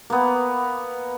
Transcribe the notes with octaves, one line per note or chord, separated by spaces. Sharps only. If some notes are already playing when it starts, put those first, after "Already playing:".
A#3 B3